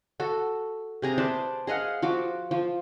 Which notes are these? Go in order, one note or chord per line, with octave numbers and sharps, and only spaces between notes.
F#4 A4
C3 G#4 A#5
B4 C5 D5 A5
G#4 D#5 F5 F#5
F3 F#4 D6
F3